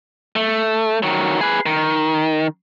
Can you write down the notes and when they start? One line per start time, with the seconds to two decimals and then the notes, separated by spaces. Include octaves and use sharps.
0.36 A3
1.03 D#3 F#3
1.41 G#4 B4
1.66 D#3